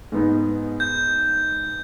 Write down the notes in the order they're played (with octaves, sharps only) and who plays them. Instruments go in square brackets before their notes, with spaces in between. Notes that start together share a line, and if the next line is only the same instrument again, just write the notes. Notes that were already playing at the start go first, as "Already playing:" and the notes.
[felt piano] G#2 B3 D#4
[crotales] G6